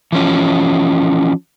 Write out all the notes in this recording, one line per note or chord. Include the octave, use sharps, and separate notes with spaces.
E3 F3 C#4